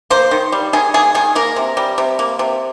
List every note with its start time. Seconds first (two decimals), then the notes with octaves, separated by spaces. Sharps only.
0.10 A#3 C5
0.31 D#3
0.52 G3
0.73 D#3 G#4
0.94 A#3 G#4
1.15 D#3 G#4
1.35 A#3 A#4
1.56 C3
1.77 G3
1.98 C3
2.19 A#3
2.39 C3